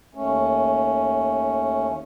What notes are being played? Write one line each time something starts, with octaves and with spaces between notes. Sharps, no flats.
D#2 A3 C#4